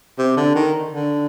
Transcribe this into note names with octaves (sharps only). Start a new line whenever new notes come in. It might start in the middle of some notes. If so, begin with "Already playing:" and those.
C3
D3
D#3
D3